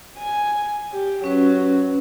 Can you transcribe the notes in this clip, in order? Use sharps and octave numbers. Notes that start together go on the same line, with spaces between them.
G#5
G4
F#3 C#4 B4